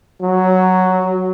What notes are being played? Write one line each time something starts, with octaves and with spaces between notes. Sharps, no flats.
F#3